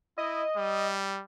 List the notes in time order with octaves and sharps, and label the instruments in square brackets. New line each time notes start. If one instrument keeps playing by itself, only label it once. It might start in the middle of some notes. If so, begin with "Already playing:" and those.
[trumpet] E4 [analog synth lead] D#5
[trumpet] G3